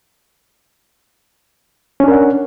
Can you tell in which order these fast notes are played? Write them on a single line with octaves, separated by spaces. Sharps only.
C#4 D4 A#4 F#5